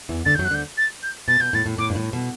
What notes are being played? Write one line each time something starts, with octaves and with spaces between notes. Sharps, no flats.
E2 E3
D2 D3 A6
F#2 F#3 G6
F#6
D2 D3 G6
A6
G6
B2 A6
B2 G6
A2 A6
A2
A2 D6
G2
A2
B2